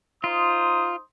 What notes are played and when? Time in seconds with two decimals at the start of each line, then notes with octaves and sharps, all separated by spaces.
0.24 D#4 F4 C5 D#6